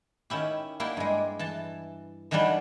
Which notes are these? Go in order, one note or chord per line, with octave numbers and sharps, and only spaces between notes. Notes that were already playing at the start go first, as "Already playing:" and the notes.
D#3 C#4 E4 G4
A#3 D4 E4 G4
G2 G#3
E3 A5
D#3 E3 F#3 G3 D4 B4